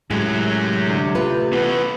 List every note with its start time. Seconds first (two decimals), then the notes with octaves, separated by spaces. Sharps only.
0.11 F#2 A2 C3 F#3 G#3
0.85 D3
1.15 A3 F4 B4
1.53 E3 A3 B3